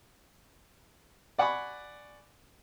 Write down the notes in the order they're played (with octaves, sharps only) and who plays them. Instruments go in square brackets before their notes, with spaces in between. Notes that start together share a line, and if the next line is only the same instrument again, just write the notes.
[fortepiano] D5 F#5 G#5 B5 C#6 D6